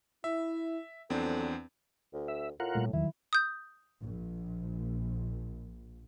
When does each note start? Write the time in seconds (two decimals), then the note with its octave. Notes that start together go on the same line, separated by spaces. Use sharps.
0.24 E4 E5
1.10 E2 F3 F#3 C4 D4 A4
2.14 D2
2.28 E5
2.60 A2 F4 A#4 F#5
2.75 A#2 G3 A3
2.93 E2 D#3 F#3 G3 E4
3.33 D#6 G6
4.03 A#1